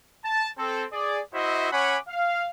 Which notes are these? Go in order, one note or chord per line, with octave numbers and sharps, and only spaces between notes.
A5
C4 A4
G#4 D5
E4 F#4 C5 D#5 E5
C#4 C#5 F#5 G#5 B5 D6
F5